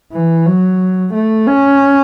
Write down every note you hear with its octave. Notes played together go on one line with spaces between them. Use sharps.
E3
F#3
A3
C#4